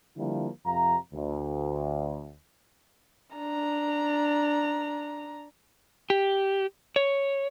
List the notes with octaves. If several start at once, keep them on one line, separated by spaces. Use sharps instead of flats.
D3 F3 G3 A#3 E4
F2 C3 F5 A#5
D2
D4 A#5
G4
C#5